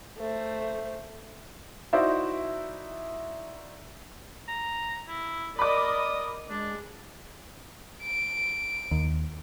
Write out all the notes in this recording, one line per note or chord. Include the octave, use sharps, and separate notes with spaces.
A3 C5
D#4 E4 F#4 C5 D5
A#5
E4
A#4 D5 D#5 B5 D6 D#6
G#3 D4
D7
D#2